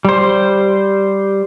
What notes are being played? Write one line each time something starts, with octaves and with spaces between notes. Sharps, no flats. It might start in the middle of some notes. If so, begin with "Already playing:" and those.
G3 C5